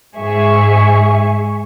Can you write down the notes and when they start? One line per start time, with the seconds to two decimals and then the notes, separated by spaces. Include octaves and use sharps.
0.16 G#2 G#4 E5 C#6